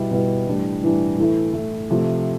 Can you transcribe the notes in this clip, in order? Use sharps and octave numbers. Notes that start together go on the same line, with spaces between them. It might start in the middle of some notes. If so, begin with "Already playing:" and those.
Already playing: B2 G3 B3 E4
B2 G3 B3 E4
A2 E3 G3 D4
A2 E3 G3 D4
A2 E3 A3 E4
A2 E3 A3 E4
C3 F3 A3